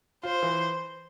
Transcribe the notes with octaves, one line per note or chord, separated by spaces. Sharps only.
F4 C5
E3